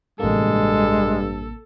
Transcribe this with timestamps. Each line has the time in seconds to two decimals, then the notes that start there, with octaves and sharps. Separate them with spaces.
0.20 A1 G2 C3 G#3 A#3 A4